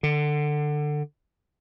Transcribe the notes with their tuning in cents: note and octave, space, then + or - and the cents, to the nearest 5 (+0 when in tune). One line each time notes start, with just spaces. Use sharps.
D3 +20